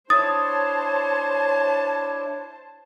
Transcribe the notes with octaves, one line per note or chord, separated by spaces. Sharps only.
D4 E4 C5 C#5 A5 D#6 A6